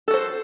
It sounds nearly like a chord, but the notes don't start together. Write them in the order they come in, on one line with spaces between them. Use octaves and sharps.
A4 F#4 C5